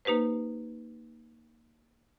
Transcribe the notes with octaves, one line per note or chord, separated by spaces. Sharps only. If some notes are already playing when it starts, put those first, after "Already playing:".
A#3 D#4 G4 B4 C5